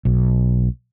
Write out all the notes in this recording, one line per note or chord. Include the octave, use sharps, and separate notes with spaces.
B1